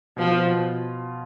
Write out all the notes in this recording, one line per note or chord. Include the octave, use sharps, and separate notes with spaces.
B2 F3
F4
B2